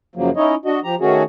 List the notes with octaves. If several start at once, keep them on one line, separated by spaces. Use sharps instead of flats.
F#2 C#3 F3 F#3 A#3
C#4 D#4 E4 C#5 D#5
D4 F#4 D#5
F3 G4 A#5
D#3 A3 C#4 F#4 G#4